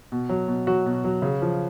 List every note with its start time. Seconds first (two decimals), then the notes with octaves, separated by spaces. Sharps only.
0.12 B2
0.29 F#3
0.48 B2
0.67 F#3 F#4
0.86 B2
1.04 F#3
1.22 C#3
1.42 F3